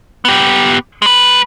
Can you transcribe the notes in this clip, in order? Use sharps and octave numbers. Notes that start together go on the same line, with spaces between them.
B3 G4
G#3 B4